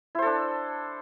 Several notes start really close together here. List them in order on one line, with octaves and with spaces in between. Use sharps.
E4 C5 A4 D4